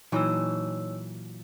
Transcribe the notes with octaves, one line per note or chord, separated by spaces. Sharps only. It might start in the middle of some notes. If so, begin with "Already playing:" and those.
A#2 E3 F#3 D#4 C#5 E6